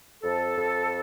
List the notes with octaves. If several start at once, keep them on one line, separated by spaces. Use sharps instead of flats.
F2 A4
F2